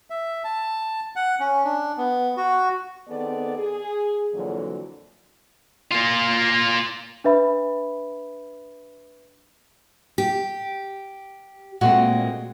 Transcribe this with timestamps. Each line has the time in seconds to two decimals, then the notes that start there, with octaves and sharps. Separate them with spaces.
0.10 E5
0.44 A5
1.16 F#5
1.40 C#4
1.64 D4
1.97 B3
2.37 F#4
3.08 D#3 B3 C4 G#4 A4 D5
3.58 G#4
4.33 F2 A#2 D3 E3 F#3
5.91 A#3 F4
7.24 D4 B4 E5 B5
10.18 G4
11.81 A#2 G#3 A3 C4 F#4